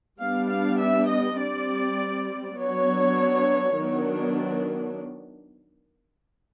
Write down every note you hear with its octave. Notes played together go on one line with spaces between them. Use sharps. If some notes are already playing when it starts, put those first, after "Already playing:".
G3 B3 D4 F5
F5
E5
D#5
G3 C4 D5
F#3 B3 D4 C#5
D#3 F#3 B3 D4